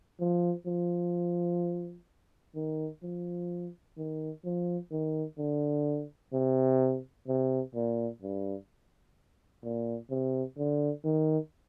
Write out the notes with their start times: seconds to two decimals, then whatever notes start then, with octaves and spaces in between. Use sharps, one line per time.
0.20 F3
0.67 F3
2.56 D#3
3.03 F3
3.97 D#3
4.45 F3
4.91 D#3
5.38 D3
6.33 C3
7.28 C3
7.75 A#2
8.22 G2
9.64 A#2
10.10 C3
10.57 D3
11.05 D#3